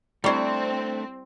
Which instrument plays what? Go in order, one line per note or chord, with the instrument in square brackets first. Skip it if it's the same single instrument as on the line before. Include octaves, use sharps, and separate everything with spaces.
[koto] G3 C5 [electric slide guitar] A3 D4 [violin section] C4 [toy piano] E4 G4 D5